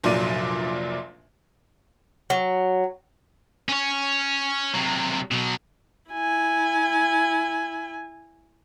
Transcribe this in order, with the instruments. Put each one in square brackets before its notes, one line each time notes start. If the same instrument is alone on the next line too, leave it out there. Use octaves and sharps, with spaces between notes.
[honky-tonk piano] F1 A#1 A#2 F#3 D5 D#7
[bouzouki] F#3
[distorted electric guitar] C#4 C#5
C3 F#3
B2 F#3
[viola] E4 G#5